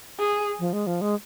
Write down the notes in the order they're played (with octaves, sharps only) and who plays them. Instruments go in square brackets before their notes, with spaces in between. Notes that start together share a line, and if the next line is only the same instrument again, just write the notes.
[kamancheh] G#4
[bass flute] F3
G#3
F3
G#3